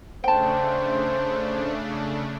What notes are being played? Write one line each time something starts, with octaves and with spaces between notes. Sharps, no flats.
C#3 A3 D4 C5 G5 A5